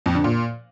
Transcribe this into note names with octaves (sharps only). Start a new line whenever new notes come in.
F2
D3
A#2